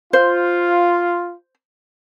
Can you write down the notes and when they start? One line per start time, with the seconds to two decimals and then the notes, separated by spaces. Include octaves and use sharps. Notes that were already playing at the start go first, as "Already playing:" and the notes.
0.13 F4 C5